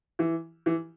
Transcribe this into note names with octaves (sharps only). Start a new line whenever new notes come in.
E3
E3